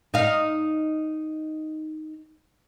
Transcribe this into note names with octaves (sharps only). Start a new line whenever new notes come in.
D#4 F5